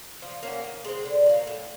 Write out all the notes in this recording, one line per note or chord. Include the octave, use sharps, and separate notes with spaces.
F3
A#3 C#4 F#4
D#3
G#3 C4
D3
F#3 A#3
A2